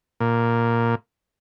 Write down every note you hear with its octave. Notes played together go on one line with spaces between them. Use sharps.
A#2